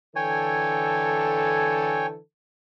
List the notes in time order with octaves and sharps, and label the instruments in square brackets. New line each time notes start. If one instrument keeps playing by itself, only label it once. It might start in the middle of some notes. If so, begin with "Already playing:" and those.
[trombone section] D3 E3 A4 [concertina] C#5 G5 G#5